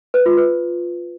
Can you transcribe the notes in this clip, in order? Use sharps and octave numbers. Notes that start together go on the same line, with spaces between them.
B4
F4
B4